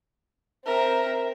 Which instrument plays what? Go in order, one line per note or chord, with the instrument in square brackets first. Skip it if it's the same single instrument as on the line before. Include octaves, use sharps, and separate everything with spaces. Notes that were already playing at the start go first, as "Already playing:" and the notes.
[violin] C4 E5 [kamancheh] A#4